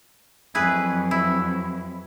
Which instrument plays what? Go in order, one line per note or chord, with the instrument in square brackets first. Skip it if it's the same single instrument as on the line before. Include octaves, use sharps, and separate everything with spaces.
[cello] F2 F#3 [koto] E4 G#4 B4
[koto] E4